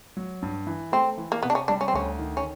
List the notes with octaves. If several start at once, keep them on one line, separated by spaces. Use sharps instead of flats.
F#3
G2
E3
A3 C4
E3
A#3
C3 B3
D4
C#4
G3 D4
C#4
C4
D2 C#4
D#3
C#4